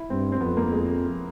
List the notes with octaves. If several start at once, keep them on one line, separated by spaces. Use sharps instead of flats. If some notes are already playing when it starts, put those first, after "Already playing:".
Already playing: E4
G2 C4
C4
F2 B3
A#3
G#3